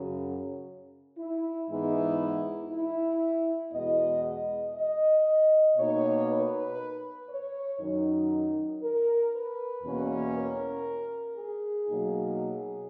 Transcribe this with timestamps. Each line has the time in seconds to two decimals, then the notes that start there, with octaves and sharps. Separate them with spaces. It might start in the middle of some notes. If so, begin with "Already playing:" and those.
Already playing: F#2 C#3 F#3
1.18 E4
1.69 G#2 E3 G#3 B3 D#4 E4
2.71 E4
3.72 E2 B2 G#3 B3 D#5
4.23 D#5
4.75 D#5
5.77 B2 A#3 D#4 C#5
6.28 B4
7.30 C#5
7.80 F#2 D#3 F#3 D#4
8.82 A#4
9.33 B4
9.83 E2 B2 A#3 C#4
10.34 A#4
11.37 G#4
11.87 B2 F#3 A#3 D#4
12.39 G#4